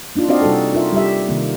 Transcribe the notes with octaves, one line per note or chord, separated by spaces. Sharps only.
A#3 D4 D#4 F4
C4 D4 F#4 D5 D#5 F5
C3 G3 D#4 F#4 A4
D#4 F4 A#4 E5
G3 G4 E5
C3 D#3 A#3